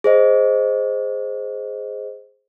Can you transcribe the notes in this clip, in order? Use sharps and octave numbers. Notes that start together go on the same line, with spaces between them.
G#4 C5 D#5